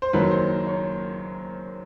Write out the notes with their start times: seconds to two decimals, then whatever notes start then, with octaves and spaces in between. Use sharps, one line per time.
0.02 C5
0.13 F#1 F#2 D#3 F#3 A#3 B4
0.31 C5
0.67 C#5